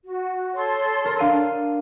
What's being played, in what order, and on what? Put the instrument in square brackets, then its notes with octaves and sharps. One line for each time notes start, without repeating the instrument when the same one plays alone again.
[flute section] F#4
A4 C#5 C6
[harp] A#4
D4 F5 D#7